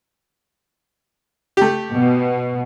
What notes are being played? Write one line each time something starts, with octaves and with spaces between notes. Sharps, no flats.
A3 G4
B2